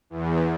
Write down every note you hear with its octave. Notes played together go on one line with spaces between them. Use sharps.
E2